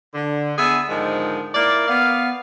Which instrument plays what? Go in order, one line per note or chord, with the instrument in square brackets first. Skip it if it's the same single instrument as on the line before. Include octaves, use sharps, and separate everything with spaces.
[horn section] D3
B3 D4 G#4 E5 G#5
G#2 D3 D#3 F3 G#3
A#3 E4 D5
B3 F5